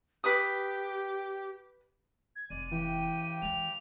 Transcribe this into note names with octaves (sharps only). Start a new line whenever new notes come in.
G4 B4 D6 D#6
G#6
F1 G#3 D5 D#7
C#3 E3 G4 G5
E3 G#3 F7